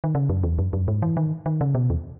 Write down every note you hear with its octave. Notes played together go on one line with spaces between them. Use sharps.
D#3
C#3
F#2
E2
F#2
F#2
G#2
E3
D#3
D#3
C#3
B2
E2